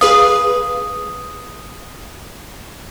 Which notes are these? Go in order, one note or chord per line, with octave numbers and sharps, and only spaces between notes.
G#4 B4 F5 D#6